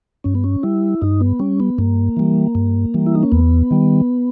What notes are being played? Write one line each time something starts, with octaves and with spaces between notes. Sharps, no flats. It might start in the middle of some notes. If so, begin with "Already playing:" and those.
G2 C#4
B3
C#4
G3 E4
G2 D#4
B3
G3 C#4
B3
G2 A#3
E3 G3
G2
E3 G3
E4
D#4
C#4
E2 B3
D#3 G3